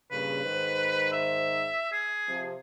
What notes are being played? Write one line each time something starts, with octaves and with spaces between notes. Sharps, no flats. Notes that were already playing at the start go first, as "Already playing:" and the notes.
G2 A#2 C#3 B4
G#2 D#3 C5
E5
G#4
C3 F3